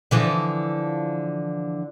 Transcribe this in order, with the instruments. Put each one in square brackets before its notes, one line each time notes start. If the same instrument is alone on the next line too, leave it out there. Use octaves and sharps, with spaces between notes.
[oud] D3 E3 F3